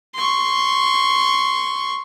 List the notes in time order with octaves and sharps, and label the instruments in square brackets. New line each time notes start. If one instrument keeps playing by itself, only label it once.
[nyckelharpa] C6 C#6